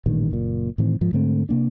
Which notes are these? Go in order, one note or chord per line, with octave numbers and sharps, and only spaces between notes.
A1 G2 A#2 D#3
F#1 A#2
A2 D#3 E3 C4
G#2 F3
G#2 D3 A3 C4
C3 A#3 D4